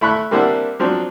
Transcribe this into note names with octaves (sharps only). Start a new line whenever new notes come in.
A3 E4 B5 C#6 F#6
G3 A#3 C4 D4 E4 F#5
F3 F#3 C4 D4